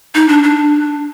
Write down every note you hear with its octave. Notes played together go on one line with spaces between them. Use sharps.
D#4
D4
D4